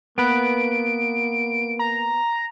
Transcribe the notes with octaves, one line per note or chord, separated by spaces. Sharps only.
A#3 B3 B4 D7
A#5